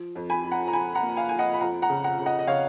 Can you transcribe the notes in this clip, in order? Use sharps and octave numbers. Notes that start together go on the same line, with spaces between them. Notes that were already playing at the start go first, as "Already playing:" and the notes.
Already playing: F3
F2
G#5 B5
F3
F#5 A#5
A#5
F3 G#5 B5
F#5 A#5
A#3
F5 G#5
F3 G#5
D#5 F#5
B5
F2 F#5 A#5
F#5 A#5
C#3
F#5 A#5
C#3
D#5 F#5
D#5
C#3 C#5 F5